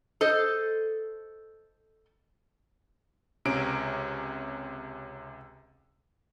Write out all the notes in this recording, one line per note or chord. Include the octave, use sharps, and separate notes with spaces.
A4 C5 D#5
C#2 C3 C#4 A#5 D7